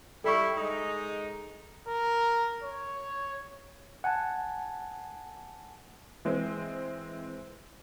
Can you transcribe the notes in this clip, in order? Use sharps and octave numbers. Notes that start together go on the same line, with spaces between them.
G3 E4 A4 C#6
G#3 D#4
A#4
C#5
F#5 G#5 A5
E3 G#3 C4